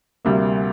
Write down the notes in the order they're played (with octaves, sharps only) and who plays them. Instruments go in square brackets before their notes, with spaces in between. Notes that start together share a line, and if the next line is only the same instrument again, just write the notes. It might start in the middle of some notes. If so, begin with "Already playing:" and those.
[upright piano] D2 C3 G3 A#3